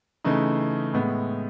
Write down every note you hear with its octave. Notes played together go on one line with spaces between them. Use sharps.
C#3 E3 A3 D#4
A2 G#3 B3